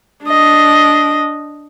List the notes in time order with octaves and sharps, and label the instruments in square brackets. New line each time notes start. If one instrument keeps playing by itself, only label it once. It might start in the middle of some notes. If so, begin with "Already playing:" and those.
[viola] D4 D#5